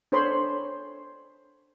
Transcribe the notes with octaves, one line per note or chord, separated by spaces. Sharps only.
D4 A4 C5 C#5 B5 C6